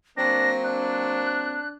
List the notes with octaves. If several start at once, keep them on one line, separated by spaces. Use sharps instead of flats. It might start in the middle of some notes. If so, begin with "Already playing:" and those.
F#3 A#3 C4 D4 A#6
D4 F#6